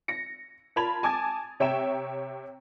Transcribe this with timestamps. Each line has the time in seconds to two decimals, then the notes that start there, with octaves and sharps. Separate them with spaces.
0.08 A#6 C#7
0.76 F4 A#4 A5 B5 G#6 F7
1.03 G#5 A5 D6 D#6 G#6 A6
1.60 C3 C#5 E5 G5 A#5 E7